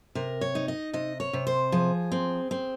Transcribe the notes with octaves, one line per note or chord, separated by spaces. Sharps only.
C3 A#4
C#5
D#4
D#5
C3 D#5
C#5
C3
C5
F3 G#4
C4
C4